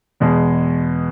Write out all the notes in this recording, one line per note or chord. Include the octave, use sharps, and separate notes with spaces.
E2 B2 G#3